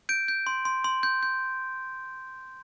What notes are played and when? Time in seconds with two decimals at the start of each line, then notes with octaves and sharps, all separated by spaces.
0.09 G6 D7
0.28 G6
0.47 C6
0.65 C6
0.84 C6
1.03 G6
1.23 G6